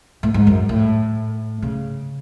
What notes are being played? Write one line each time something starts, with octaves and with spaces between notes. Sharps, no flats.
A2
G#2
F#2
A2
C#3